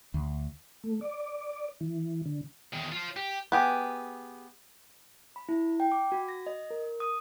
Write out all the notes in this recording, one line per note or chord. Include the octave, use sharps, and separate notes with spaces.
D2
A3
D5
E3
D3
E2 D#3
F4 C5
G4
B3 G4 G#4
B5
E4
G5
D6
F#4
A#6
D#5
A#4
D#6